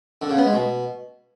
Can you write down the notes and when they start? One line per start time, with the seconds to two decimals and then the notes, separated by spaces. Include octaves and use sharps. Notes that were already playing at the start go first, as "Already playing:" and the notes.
0.22 D3
0.29 C#3
0.37 B3
0.45 G#3
0.53 B2